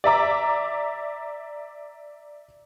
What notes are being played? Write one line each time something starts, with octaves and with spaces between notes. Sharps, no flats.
D5 E5 A#5 D6